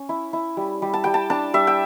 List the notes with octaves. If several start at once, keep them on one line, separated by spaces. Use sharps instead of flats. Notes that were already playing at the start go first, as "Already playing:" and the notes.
Already playing: C#4
E4
E4
G3
G3
A5
G3 G5
A5
D4 A5
G3 E5
G5